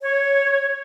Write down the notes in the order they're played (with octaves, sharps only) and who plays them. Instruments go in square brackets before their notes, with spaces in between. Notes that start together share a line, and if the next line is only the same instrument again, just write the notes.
[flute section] C#5